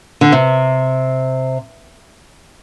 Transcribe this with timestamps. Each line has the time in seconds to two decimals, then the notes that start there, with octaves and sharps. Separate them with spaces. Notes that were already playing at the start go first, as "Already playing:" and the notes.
0.21 D3
0.32 C3